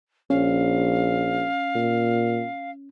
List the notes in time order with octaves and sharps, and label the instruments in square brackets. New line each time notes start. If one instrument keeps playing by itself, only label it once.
[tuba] A#1 [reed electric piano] C#4 [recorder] F5
[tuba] A#2